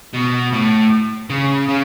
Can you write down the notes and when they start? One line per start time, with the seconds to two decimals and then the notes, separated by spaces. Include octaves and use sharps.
0.14 B2
0.53 A2
1.30 C#3
1.69 C#3